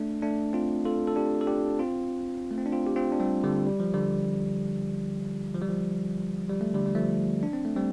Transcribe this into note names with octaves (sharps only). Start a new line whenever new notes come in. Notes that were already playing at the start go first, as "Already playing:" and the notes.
Already playing: A3 D4
A3 D4
C4 F4
F4 A4
A4
D4 G4
A4
D4 G4
C4 F4
A3
C4
D4
C4 F4
G4
C4 F4
D4
G3 C4
D3 G3
G3
F3
D3 G3
F3
G3
F3
G3
A3
D3 G3
G3
F3 A3
D4
C4
A3
G3 C4